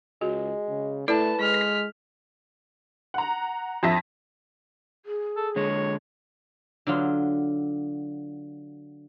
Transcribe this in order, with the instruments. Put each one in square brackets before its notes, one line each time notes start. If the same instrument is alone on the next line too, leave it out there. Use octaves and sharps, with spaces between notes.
[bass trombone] C#2 [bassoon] G#3 [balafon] F#4
[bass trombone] C#3
[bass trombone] A3 [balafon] E4 A4 D5 [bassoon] B4 [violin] A5
[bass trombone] G#3 [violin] F6 B6
[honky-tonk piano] F#5 A#5
F2 E5 A5 A#6 B6
[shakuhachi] G#4
[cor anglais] A4
[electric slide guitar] D3 G#3 [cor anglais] C#5
[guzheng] D3 F#3 F4